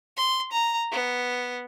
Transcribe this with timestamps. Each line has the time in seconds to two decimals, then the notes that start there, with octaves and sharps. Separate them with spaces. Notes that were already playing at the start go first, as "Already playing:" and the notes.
0.17 C6
0.52 A#5
0.92 B3